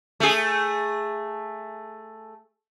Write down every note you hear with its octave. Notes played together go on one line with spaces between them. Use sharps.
A3 G#4